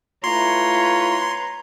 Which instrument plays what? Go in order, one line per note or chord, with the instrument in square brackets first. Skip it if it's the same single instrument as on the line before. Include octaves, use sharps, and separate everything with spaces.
[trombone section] A3 E4 F4 [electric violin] B4 A#5 [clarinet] C#5 [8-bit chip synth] C6